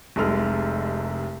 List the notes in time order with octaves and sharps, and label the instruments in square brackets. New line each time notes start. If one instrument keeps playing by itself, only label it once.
[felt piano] F1 C2 G#3 A4 F6